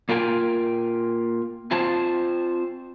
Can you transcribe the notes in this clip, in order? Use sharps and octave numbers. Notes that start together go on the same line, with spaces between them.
A#3 F4 A#4 G5 G#5
C4 F4 C5 G#5 A5